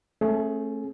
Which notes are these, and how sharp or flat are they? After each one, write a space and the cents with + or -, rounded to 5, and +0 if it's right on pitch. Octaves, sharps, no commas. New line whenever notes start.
A3 +0 C#4 -45 G#4 +25